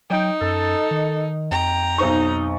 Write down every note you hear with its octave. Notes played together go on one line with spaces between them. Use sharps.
F#3 D#4 G5
F#2 A4
D#3
F2 G5 A#5
B1 D#4 C5 C#6